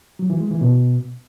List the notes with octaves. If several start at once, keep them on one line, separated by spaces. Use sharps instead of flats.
F#3
E3
G#3
E3
B2